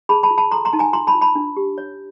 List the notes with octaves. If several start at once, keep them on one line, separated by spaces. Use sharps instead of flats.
G#4 A5 B5
A5 B5
F4
A5 B5
A4 A#5 C6
A#5 C6
D#4 A5
G#5 A#5
F4 A#5 C6
A5 B5
F4
A5 B5
D4
G4
C#5